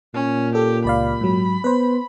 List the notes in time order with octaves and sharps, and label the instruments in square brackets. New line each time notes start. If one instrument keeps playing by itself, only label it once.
[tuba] A#2 [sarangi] C#4
[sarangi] G4 [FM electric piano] A4
[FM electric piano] C#2 D5 F5 [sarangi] B5
[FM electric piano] G#2 F#3
[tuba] B3 [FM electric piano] B4 C5